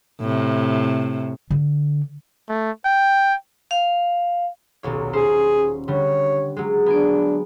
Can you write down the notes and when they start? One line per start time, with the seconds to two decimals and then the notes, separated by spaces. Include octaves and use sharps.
0.21 A2 C3
1.50 D3
2.49 A3
2.85 G5
3.71 F5
4.83 D#1 B1 C#5
5.13 C#4 G#4 C5
5.88 D3 G3 C#5
6.57 F#3 G#3
6.86 B3 D4 G#5 D7